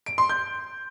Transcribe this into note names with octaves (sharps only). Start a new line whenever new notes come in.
D7
C6
G6